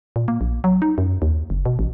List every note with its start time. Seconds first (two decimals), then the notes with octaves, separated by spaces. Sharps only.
0.16 A#2
0.28 A#3
0.41 A#1
0.64 F#3
0.82 D#4
0.98 F#2
1.22 D#2
1.50 F#1
1.66 B2
1.79 A1